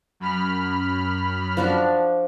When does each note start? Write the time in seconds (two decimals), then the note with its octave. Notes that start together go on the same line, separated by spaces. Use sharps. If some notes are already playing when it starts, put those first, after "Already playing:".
0.20 F#2 B5 F6
1.57 F3 D4 F#4